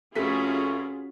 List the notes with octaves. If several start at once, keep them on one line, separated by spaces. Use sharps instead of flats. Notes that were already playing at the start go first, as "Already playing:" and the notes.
F1 A3 C#4 F4 F#4 G#4 B6